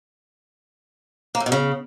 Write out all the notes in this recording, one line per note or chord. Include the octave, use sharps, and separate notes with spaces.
A#3
A2
B2
C#3